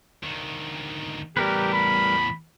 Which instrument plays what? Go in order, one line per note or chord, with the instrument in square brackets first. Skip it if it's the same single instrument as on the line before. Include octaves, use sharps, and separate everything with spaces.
[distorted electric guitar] D2 D#3
[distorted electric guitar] E2 A2 [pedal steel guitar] G3 A#4 B4 [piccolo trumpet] G4
[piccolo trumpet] B5